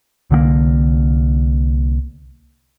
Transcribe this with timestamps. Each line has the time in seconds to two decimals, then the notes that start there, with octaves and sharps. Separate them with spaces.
0.30 C2 D3 F3 A#3